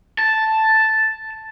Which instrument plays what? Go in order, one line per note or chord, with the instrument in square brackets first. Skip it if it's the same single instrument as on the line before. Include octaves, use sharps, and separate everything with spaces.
[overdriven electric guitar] A5